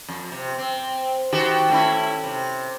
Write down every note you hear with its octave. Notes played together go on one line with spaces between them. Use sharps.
F2
C3
C4
D#3 F#4 G4
A3 C#4 E4
C3